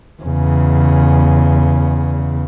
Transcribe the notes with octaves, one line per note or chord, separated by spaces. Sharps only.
E2 C#3